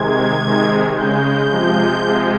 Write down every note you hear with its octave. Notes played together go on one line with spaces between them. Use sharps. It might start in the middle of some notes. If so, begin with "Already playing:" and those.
Already playing: C3 D#3 G#3 G#6
C3 D#3 G#3
C#3 G#3 G6
C3 F3 G#3
C3 F3 G#3